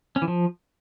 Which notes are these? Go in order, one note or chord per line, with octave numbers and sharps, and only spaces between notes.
C#4
E3
F3